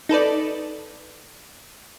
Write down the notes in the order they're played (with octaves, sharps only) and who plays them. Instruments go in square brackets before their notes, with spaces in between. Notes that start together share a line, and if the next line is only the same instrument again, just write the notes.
[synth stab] D#4 A4 B4 D5